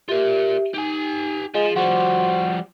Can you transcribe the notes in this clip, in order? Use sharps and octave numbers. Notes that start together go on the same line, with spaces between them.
F4 G4 A#4 E5
D#4 G4 G#5
F3 G#3 G#4
F3 G3 F#4 C5 C6